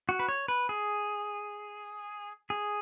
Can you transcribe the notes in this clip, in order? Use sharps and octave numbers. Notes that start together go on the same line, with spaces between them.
F#4
B4
C#5
B4
G#4
G#4